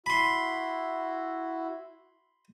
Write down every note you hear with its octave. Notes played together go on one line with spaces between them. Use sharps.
E4 F#4 B5 C6